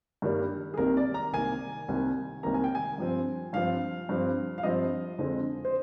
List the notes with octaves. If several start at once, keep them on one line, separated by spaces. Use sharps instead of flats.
G2 D#3 G3 A#3
G#4
C2 C3 D#3 A#3 A#4
D5
A#5
C2 C3 D#3 A#3 G#5
C2 C3 D#3 A#3
C2 C3 D#3 A#3 A#5
G#5
G5
G#5
G2 F3 C4
G2 F3 C4 F5
G2 F3 C4
F5
G2 F3 C4 D#5
F2 D3 F3 G#3 C4
C5